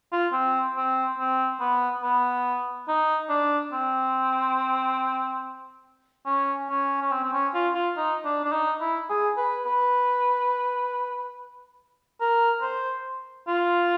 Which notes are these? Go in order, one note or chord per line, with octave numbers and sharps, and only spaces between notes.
F4
C4
C4
C4
B3
B3
D#4
D4
C4
C#4
C#4
C#4
C4
C4
C#4
F4
F4
D#4
D4
D4
D#4
E4
G#4
B4
B4
A#4
C5
F4